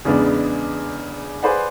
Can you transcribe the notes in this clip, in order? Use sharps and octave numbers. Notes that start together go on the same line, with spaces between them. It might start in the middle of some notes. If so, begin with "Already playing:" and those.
E2 C#3 G#3 B3 D4
G#4 B4 C5 D5 F#5